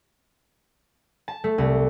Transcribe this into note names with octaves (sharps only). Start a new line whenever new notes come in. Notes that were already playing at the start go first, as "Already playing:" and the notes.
A5
A3
C2